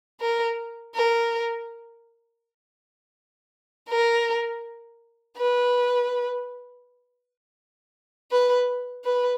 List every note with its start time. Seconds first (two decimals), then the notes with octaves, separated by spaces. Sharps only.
0.20 A#4
0.95 A#4
3.89 A#4
5.37 B4
8.31 B4
9.05 B4